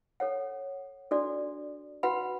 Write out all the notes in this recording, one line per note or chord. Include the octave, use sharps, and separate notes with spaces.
A4 C#5 F#5
D4 F#4 A4 D5
F#4 B4 F#5 B5